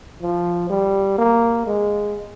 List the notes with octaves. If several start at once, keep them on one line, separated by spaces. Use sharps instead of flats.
F3
G3
A#3
G#3